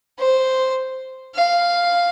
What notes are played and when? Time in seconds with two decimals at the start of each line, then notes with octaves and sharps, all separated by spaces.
0.20 C5
1.36 F5